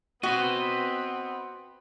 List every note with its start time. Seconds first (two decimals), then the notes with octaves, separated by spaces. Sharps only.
0.23 B3 C4 F#4 B4 D#5